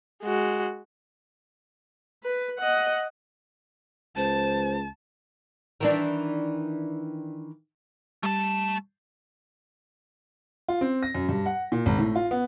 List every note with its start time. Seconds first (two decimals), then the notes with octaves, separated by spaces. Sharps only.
0.23 G#3 F#4
2.23 B4
2.59 D#5 F#5
4.17 C#2 C5 A5
5.80 D#3 E3 D4
8.23 G3 A3 A5
10.69 F4
10.81 C4
11.03 A#6
11.15 F#2
11.29 G2
11.46 F#5
11.72 A#2
11.86 G#1
11.99 A2
12.16 F4
12.31 B3